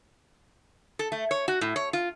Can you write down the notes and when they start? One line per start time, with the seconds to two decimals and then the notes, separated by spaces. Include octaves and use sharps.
0.99 A4
1.12 A3
1.31 C#5
1.48 F#4
1.61 A2
1.76 C#5
1.93 F4